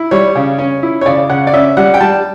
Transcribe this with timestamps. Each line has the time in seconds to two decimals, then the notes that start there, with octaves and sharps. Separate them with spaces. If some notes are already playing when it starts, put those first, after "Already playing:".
Already playing: E4
0.11 G3 C#5
0.35 C#3
0.59 C#4
0.83 E4
1.01 C#5
1.06 C#3 D5
1.29 C#3 F#5
1.47 D5
1.54 C#4 E5
1.77 G3 F#5
1.94 G5
2.00 G3 A5